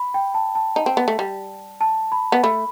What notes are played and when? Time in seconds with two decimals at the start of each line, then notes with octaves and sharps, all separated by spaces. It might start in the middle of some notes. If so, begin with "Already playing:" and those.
Already playing: B5
0.14 G5
0.34 A5
0.55 A5
0.76 D#4
0.86 C4
0.97 B3
1.08 A3
1.19 G3
1.81 A5
2.12 B5
2.32 B3
2.43 A3 B5